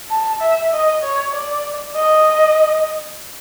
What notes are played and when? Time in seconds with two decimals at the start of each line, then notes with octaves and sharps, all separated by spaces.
0.11 A5
0.41 E5
0.73 D#5
1.03 C#5
1.33 D5
1.95 D#5